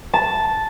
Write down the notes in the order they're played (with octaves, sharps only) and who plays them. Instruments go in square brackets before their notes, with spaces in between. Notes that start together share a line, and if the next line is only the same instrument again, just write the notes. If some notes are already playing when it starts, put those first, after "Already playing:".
[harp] A5